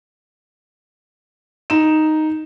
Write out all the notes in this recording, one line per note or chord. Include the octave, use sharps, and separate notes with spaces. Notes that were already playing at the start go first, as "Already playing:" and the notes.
D#4 E7